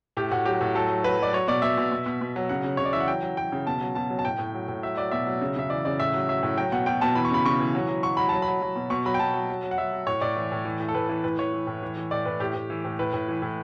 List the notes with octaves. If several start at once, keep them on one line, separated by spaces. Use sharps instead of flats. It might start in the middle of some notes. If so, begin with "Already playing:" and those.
A2 G4
A2 F#4
F#3 G4
A2
F#3 A4
F#3
F#3 B4
F#3 D5
F#3 C#5
B2 D5
B2 E5
B2
B2
B2
B2
F#3
C#3 F#5
C#3
C#3 C#5
D5
E3 E5
F#5
F#3 G5
F#3
F#3 G5
C#3
B2 A5
F#3
B2 A5
F#3
A5
A2 G5
A2
F#3
A2
F#3 E5
F#3 D5
B2 E5
F#3
C#3
C#3 E5
E3 D5
C#3 D5
A2 E5
F#3
F#3 E5
A2
F#3 G5
B2 F#5
B2 G5
B2 A5
E3 B5
C#6
C#3 B5
C#3 C#6
E3
F#3
F#3
F#3 C#6
F#3 B5
F#3 A5
B5
F#3
F#3
B2
B2 C#6
F#3 B5
G5
B2 A5
F#3
F#3
F#3
F#5
F#3 E5
F#3
A2 C#5
A2 D5
E3
A2
E3
A2
A4
A2 B4
E3 A4
A2 B4
E3 C#5
E3
A2
E3
E3
A2 D5
A2 B4
A2 G4
A2
E3
A2
A2 B4
A2
E3
A2